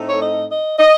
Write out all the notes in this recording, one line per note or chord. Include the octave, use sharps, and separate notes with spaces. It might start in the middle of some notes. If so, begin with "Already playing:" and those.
Already playing: A2 A3 C4 D#4
C#5
D#5
D#5
D#5